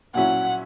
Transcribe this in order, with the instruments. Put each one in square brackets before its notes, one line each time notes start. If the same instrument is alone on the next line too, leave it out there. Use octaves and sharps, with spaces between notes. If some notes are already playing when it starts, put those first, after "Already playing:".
[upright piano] A#2 F#3 C#4 E4 [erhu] F#5